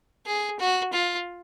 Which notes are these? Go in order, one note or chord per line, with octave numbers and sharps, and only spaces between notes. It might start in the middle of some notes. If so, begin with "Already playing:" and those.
G#4
F#4
F4